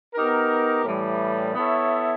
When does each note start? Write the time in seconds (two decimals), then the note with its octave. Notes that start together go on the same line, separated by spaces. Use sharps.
0.15 B3 D#4 G4 A#4
0.85 A2 E3 G3
1.55 B3 E4 A4 C#5 E5